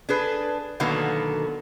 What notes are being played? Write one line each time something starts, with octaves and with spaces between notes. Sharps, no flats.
D4 G#4 B4
B2 D3 D#3 F#3 A#3 B3